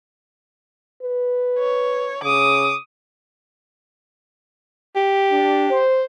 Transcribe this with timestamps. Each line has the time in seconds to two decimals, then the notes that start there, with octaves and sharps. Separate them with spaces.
1.03 B4
1.59 C#5
2.23 C#3 D6 D#6
4.96 G4
5.31 D4
5.70 C5